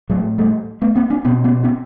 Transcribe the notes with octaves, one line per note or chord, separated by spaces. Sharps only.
A2 F#3 G#3
G3 A3
A3 B3
A#3 C4
C4 D4
B2 B3 C#4
B3 C#4
B3 C#4